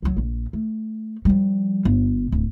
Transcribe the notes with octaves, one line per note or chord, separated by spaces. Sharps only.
C#2 F#3
A#1
A3
F3 G3
G1
D1